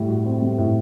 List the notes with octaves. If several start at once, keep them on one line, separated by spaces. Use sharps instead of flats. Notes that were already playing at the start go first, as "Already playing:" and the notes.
Already playing: A2 G3
F#4
C4
G3
A2